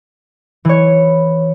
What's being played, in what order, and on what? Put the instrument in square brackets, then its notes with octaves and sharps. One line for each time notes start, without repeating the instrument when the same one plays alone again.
[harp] E3 C#5